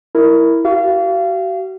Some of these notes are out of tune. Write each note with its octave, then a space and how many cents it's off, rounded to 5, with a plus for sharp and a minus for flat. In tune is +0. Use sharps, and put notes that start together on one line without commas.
E4 +0 A#4 -5
F#4 +40 F5 -30